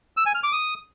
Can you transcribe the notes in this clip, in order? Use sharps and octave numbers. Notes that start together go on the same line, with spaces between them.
E6
G#5
F6
D6
D#6